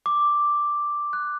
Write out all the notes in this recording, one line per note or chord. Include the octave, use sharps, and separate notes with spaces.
D6
F#6